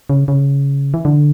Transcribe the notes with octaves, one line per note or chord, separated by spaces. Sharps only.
C#3
C#3
E3
D3